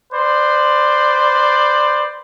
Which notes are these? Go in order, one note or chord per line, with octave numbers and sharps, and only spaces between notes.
B4 C5 D5